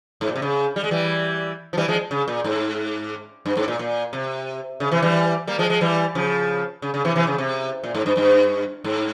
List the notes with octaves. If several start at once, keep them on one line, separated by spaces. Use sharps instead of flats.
G#2
A#2
C3
C#3
G3
G#3
E3 G3
F3
E3 G3
F3 G#3
C#3
A#2
G#2
G2
G#2
A#2
A#2
C3
C#3
C3 E3
E3 G3
G3 A#3
F3 G#3
F3 G#3
E3 G3
C#3 F3
C#3
C#3
C3 E3
C3 E3
C#3
C3
A#2
G#2
G2
G2
G#2